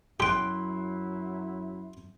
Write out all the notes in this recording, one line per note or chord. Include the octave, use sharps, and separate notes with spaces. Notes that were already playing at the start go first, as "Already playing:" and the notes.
F#2 F#3 E4 G4 G5 C6 F#6